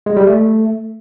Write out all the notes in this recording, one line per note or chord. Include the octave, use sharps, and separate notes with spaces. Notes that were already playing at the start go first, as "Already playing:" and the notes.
G#3
G3
A3